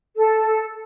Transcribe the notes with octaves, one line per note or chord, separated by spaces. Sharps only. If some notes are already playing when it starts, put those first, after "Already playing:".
A4